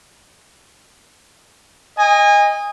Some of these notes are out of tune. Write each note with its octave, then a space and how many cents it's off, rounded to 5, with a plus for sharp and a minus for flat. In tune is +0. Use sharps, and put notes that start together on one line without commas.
D#5 +0 G#5 -30